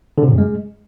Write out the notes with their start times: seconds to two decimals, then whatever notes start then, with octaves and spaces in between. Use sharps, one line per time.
0.18 D3
0.23 C3
0.28 A#2
0.33 F#2
0.38 G#3